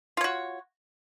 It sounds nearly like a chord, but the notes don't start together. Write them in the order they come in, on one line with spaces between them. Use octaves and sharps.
F4 C#5 F#4